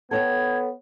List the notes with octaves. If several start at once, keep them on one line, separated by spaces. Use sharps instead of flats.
B3 A4 C#5 G5 G#6